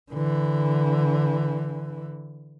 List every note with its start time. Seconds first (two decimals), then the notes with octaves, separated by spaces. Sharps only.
0.10 D3 E3